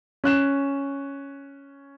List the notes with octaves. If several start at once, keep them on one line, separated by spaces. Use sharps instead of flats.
C#4 F#6 E7